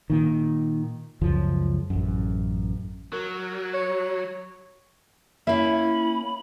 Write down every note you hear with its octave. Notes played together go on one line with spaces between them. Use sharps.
A#2 D#3
C#2 F#2 F3
A1 F#2
F#3 A#4
C#5
A#3 C#4 E4 E5 B5